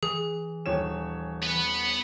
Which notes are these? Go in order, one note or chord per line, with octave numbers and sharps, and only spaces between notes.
E3 G#4
D#1 C#5 E7
B3 B4